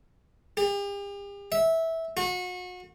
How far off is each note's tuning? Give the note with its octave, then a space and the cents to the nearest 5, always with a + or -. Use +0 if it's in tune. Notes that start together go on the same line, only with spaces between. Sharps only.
G4 +45
E5 -15
F#4 -35